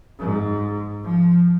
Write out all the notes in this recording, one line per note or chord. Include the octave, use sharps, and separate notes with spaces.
G#2
F3